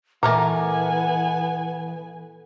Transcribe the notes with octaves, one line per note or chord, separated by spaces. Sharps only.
A#2 E3 A3 B3 A#4 G#5 A#5 D6